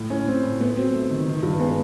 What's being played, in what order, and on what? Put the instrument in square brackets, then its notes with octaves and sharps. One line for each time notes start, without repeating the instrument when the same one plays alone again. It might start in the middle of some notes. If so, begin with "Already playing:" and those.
Already playing: [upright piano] A2
A2 C#4
A2 C4
A2
A3 B3
F#3 C4
A3
D#3
D#3
G2
G#3 B3